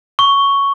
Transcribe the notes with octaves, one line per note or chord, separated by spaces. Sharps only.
C#6